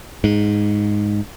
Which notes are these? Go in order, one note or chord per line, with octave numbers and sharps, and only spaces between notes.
G#2